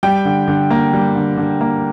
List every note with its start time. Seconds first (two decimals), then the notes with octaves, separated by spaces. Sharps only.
0.03 G3 G5
0.25 D3
0.48 D3
0.70 A#3
0.93 G3
1.15 D3
1.37 D3
1.61 A#3